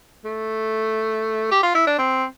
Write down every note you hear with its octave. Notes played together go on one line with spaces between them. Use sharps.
A3
G4
F4
E4
D4
C4